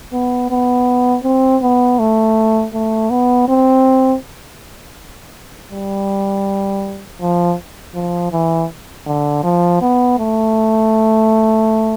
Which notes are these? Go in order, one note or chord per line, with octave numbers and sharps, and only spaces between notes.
B3
B3
C4
B3
A3
A3
B3
C4
G3
F3
F3
E3
D3
F3
B3
A3